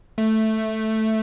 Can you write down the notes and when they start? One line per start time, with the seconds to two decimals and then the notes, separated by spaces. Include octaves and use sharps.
0.18 A3